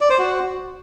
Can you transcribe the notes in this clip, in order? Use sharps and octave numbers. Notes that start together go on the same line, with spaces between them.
D5
C5
F#4